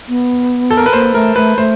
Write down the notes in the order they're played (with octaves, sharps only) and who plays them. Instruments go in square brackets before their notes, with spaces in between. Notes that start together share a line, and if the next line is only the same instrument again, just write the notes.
[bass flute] B3
[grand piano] A4
A#4
B4
[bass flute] A#3 [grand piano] C5
[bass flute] A3 [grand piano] A#4
[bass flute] A3 [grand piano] B4
[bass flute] A3 [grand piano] C5